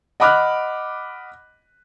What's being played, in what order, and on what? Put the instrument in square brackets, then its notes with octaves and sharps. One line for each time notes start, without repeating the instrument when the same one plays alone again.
[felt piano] D#5 F#5 B5 D6 F6 F#6